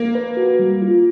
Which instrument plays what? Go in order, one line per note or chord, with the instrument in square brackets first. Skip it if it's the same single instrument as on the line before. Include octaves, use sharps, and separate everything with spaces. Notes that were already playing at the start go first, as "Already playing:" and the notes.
Already playing: [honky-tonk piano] A#3
[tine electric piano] B4
F#4
G3
F4